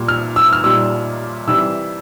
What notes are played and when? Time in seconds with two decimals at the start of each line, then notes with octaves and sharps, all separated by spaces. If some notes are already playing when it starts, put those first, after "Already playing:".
Already playing: A#2 G3
0.08 F6
0.36 E6
0.53 F6
0.64 A#2 G3 E6
1.47 C3 E3 G3 E6